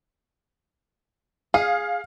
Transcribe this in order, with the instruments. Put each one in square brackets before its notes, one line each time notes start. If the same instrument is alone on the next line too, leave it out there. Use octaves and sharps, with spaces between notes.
[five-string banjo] G#4 [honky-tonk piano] F5